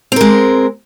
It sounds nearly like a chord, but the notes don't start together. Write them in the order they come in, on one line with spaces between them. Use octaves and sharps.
C4 A#4 G#3